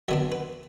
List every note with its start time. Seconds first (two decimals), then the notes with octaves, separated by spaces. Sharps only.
0.08 F#2 D3 B3 D4 E5
0.32 B4